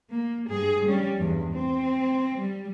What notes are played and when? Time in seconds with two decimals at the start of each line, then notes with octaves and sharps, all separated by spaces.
0.10 A#3
0.49 G2 G#4
0.85 G3 C#4
1.18 E2 G2
1.53 C4
2.39 G3